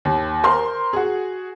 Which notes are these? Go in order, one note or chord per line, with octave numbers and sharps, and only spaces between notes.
D#2
A#4 C5 C6
F#4 G#4